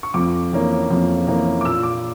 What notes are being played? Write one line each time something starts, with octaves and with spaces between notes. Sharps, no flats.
C#6
F2 D6
E3 A#3 C#4
F2
E3 A#3 C#4
D6
A#2 E6
D6